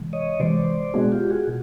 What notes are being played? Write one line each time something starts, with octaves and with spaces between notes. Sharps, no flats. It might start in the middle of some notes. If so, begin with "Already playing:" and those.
Already playing: C3 E3 G#3
C#5 D#5
C3 E3 G#3 C5 D5
B2 G#3 B3 D4 F#4 G#4
F4 G4
F#4 G#4
B2